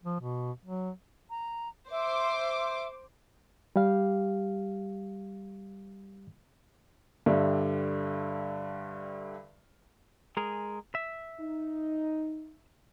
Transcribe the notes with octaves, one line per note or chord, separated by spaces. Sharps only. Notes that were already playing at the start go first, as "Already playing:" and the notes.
F3
B2
F#3
A#5
C5 E5 D6
G3 G4 F5
G2 D3 G3 E5
G#3 G#4 A#4
E5
D#4